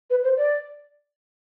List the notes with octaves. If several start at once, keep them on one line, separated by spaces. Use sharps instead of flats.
B4
C5
D5